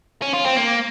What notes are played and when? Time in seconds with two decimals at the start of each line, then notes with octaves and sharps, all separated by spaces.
0.22 C#4
0.34 F4
0.45 C4
0.57 A#3